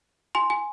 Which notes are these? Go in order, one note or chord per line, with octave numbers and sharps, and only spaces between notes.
G#5 C6
G#5